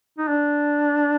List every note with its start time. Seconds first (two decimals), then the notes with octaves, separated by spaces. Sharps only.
0.18 D#4
0.28 D4